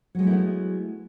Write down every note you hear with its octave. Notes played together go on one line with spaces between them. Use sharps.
F#3 G#3 A3 B3 E4